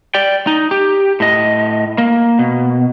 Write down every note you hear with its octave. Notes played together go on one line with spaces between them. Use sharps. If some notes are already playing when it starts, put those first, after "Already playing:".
D5 G5
D#4
G4
A2 D#5
A#3
B2